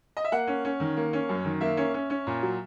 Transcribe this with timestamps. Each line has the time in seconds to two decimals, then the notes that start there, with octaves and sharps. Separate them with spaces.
0.17 D#5
0.24 E5
0.32 A#3 F#5
0.47 C#4
0.65 C#4
0.80 D#3
0.97 A#3
1.13 C#4
1.29 F#2
1.45 D#3
1.61 A#3 E5
1.77 C#4
1.94 C#4
2.10 C#4
2.27 A#2
2.42 F#3